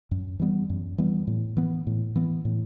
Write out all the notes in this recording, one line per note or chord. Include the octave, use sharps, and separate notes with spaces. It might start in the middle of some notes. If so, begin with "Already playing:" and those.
F#2
E3 G3 B3
F#2
E3 G3 B3
A2
E3 B3
A2
E3 B3
A2